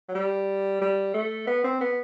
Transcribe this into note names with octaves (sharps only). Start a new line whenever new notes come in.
F#3
G3
G3
A3
B3
C4
B3